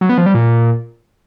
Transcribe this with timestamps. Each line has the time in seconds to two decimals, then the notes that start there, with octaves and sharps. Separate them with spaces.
0.01 F#3
0.09 B3
0.18 F3
0.26 G3
0.34 A#2